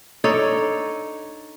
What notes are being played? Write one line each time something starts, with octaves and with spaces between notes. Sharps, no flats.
D4 D#4 A4 C#5